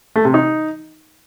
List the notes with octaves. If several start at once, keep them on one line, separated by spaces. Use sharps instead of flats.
A3
C3
D#4